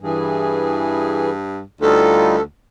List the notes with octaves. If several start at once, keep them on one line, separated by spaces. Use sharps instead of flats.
G2 E3 G#4
D2 G3 D#4 F4 A4